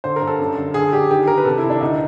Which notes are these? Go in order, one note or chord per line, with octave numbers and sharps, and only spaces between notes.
D3 C5
A#4
G2
A4
F#2
D3
D3 G#4
D3 G4
D#3 G4
D#3 A#4
B4
C3 A4
E4
C3
D4
D2 D#4